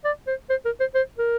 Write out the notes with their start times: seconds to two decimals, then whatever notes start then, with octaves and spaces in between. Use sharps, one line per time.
0.05 D5
0.27 C5
0.50 C5
0.65 A#4
0.80 C5
0.95 C5
1.18 A#4